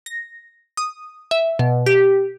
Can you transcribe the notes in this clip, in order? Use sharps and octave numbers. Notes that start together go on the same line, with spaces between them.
A#6
D#6
E5
B2
G4